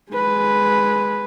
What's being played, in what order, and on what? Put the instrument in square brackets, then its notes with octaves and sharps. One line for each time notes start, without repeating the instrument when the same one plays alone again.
[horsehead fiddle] G#3 B4